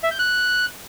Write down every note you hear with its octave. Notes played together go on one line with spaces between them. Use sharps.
E5
G6
F#6